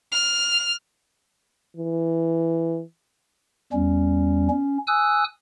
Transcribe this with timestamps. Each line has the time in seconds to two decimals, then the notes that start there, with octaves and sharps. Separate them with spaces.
0.12 F6
1.77 E3
3.73 E2 G3 C#4
4.50 C#4
4.87 G#5 D#6 E6 F#6